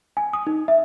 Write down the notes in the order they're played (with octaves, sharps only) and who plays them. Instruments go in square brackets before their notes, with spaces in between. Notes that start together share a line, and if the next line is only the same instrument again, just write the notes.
[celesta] G#5
D#6
D#4
E5